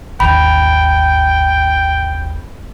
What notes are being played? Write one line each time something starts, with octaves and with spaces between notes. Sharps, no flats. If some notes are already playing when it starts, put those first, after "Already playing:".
G#1 D#2 G5 B5